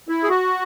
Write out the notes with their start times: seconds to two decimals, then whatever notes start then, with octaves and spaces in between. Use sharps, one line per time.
0.09 E4
0.23 G#4
0.29 F#4